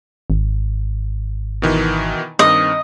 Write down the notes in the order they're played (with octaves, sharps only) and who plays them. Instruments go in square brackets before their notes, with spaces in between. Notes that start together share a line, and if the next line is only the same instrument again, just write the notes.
[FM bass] G#1
[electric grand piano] B2 D#3 E3
[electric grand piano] G2 D#3 C4 [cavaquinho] D#5